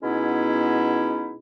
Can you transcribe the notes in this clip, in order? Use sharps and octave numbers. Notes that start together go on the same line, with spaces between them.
B2 G#3 B3 C#4 D#4 E4